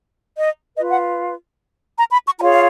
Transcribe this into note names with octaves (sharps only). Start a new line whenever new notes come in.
D#5
F4 B4 D#5
F#5
A#5
B5
C#6
F4 G#4 C#5 A#5
F5